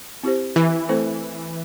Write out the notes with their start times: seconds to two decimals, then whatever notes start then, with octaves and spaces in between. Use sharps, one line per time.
0.23 C4 E4 G4 C5
0.56 E3
0.89 A3 C4 E4 A4 C5